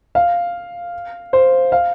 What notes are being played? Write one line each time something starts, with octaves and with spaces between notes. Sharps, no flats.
F5
C5
F5